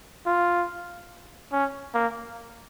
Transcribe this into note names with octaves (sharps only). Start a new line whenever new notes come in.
F4
C#4
A#3